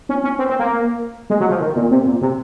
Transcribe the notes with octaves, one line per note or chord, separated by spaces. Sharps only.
C#4
C#4
C4
C4
A#3
G#3
F#3
F3
D#3
A#2
C3
A#2
C3